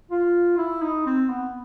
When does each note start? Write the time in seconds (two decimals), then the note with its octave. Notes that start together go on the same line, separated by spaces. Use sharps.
0.11 F4
0.58 E4
0.82 D#4
1.06 C4
1.29 B3